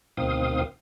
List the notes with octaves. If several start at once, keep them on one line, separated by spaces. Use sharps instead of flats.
D2 B2 D#3 C4 F5 D#6